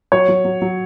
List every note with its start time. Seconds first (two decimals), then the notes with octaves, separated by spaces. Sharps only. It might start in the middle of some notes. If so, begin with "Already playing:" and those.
0.12 F#3 C#5
0.28 F#3
0.45 F#3
0.62 F#3